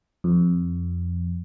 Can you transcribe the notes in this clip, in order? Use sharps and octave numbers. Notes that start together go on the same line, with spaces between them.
F2